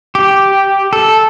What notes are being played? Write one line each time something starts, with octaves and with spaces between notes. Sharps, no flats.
G4
A4